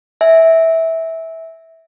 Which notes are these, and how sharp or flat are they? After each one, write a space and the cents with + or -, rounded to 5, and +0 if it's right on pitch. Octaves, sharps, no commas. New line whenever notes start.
E5 -15 G#5 +0